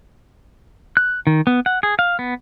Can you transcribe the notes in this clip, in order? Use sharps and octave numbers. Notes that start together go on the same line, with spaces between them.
F#6
D#3
B3
F#5
G#4
F5
B3